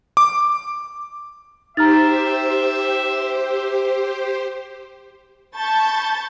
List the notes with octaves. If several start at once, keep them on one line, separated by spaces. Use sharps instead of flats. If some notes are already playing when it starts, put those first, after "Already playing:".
D6
D#4 G4 C5 E5 A#5 F6 A6
A5 B5 C#6 G6 A6